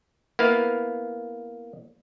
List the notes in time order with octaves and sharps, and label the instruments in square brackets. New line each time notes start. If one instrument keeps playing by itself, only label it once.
[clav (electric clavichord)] A#3 B3 E4 B4 F5